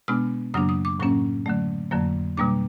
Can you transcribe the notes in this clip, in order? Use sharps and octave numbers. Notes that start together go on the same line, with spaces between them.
B2 G#3 B3 D4 F6
F#2 C#3 F#3 A#3 D4 D#6
D#6
D6
A2 F#3 A#3 C#4 C#6
D3 F#3 A3
F2 D3 F#3 A#3
B2 G3 A#3 D4 D6